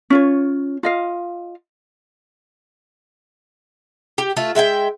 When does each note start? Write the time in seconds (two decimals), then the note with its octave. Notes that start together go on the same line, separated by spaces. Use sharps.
0.10 C#4 F4 C#5
0.83 F4 D#5 F5
4.18 G4
4.37 A3 F4
4.55 G#3 E5 F#5 G5